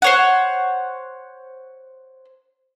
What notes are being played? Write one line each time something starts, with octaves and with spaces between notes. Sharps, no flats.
C5 C#5 F#5